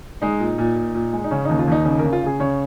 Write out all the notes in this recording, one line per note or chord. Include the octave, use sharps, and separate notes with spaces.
G#3 D#4
A#2
A#2
A#2
A#2
G#3
D#4
C#3 C#4
D#2 D#4
F4
D#2 D#4
C#3 D#4
A#4
C#3
F4
C#3 G#4
C#3 C#5